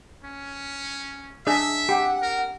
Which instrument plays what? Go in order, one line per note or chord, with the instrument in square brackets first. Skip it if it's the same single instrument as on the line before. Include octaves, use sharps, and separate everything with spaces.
[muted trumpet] C#4
[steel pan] D4 G#4 D#5 [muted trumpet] E5
[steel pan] G4 [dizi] F#5
[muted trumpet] A#4